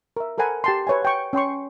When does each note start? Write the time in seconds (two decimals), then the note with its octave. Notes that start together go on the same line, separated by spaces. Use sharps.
0.17 A#4 E5
0.38 A4 A#4 C5 F#5 G#5 B5
0.64 G4 A5 C6
0.87 B4 C#5 E5 G#5
1.02 F#5 G5 C#6
1.33 C#4 G5 C6 C#6